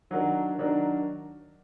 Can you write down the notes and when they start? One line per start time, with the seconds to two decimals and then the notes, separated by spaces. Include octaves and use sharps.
0.10 D#3 F#3 D4 F#4 A#4
0.58 D#3 F#3 D4 F#4 A#4